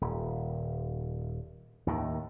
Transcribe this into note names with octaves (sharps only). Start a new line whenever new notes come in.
D#1
D#2 A2 D#3